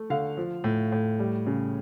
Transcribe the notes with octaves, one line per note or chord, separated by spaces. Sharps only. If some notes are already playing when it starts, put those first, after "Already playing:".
Already playing: A3
D3 F5
F3
A2
A2
G3
C#3